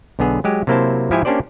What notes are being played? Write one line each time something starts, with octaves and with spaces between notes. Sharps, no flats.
B1 D3 B3 G#4
F#3 G#3 G4
C3 F#3 A#3 E4 C5 A5
G#2 F3 E4 G4 E5 G#5
A#3 C#4 D4 G4 C5 D5